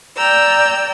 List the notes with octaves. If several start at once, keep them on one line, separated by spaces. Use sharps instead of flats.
D5 G5 A#5 E6